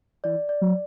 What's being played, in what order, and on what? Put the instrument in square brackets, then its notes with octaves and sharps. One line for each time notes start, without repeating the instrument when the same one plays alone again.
[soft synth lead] E3 [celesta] D5
[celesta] D5
[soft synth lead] F#3